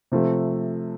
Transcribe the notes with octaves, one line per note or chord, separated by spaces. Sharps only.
C3 F3 A3